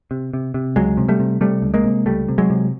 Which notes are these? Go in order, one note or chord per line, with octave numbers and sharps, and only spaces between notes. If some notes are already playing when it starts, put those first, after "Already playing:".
C3
C3
C3
C#2 F#3 G#3
C3
G3 A3
C3
C3 G3 A3
C#2
G#3 A#3
C3
C#2 G3 A3
C3
F#3 G#3
C3